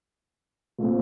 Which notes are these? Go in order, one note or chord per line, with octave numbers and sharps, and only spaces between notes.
A#2 A3 C4